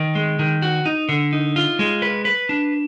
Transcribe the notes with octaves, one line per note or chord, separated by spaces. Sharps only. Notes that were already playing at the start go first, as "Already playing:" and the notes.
Already playing: D#3
G#3
D#3
F#4
D#4
D3
D#4
F4
G#3
B4
B4
D4